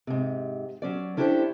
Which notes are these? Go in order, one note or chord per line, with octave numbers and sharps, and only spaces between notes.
G#2 C3
F#3 C#4 D5
C#4 D4 E4 G4 A4 C5